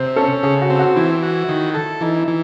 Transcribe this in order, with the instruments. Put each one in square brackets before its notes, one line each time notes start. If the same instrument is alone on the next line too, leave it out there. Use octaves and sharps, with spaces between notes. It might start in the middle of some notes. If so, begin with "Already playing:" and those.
Already playing: [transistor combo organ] C3 [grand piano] C5
[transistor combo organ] C#4 [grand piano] A4
[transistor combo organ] C#3 [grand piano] G#4
[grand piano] F#4
[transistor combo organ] C4
[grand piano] F#4
[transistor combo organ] E3 [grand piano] E4
[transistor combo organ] F#4
D#3
A4
[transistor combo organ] E3 [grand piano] D#4
[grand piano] E4
[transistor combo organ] E3